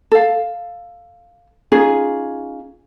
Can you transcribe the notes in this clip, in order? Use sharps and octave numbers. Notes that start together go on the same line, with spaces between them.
A4 F5
C#4 D#4 F4 G#4